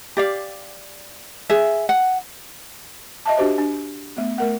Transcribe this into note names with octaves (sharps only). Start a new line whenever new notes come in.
G4 D5 F5
G#4 E5
F#5
D#5 E5 A5
D4 F#4 G4 C5 D#5
D4
A3 B3
A3 A#4 F#5